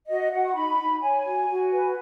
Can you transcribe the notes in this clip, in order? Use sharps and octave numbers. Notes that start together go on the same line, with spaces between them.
F#4 D#5
F#4 F#5
C#6
D#4 B5
D#4
C#5 G#5
F#4
F#4
B4